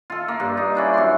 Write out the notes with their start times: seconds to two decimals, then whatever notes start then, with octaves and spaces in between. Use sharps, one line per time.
0.10 F4 A4
0.28 A#3
0.40 G2
0.57 D#4
0.75 C#4 D4 E4
0.94 F#2 C6